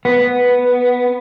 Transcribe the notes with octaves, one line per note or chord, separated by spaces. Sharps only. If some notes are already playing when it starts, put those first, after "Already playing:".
B3